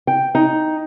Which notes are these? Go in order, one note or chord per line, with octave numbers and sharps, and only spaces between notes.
G5
D#4